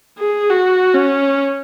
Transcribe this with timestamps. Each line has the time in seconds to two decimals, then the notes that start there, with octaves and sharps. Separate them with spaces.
0.19 G#4
0.49 F#4
0.95 C#4